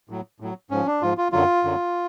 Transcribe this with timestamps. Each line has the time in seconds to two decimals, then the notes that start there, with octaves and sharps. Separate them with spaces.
0.09 A2 F#3
0.40 A2 F#3
0.71 G#2 F3 C#4
0.86 D4
1.02 G#2 F3 F4
1.18 F4
1.32 F#2 D3 F#3 F4
1.64 F#2 D3 F#3